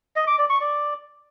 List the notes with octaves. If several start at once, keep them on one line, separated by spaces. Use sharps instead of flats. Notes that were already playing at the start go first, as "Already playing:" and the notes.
D#5
D6
D5
C#6
D5